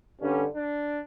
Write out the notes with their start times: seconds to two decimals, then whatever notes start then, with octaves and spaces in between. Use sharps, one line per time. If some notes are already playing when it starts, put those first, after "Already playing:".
0.21 G2 D3 G3 C#4
0.54 D4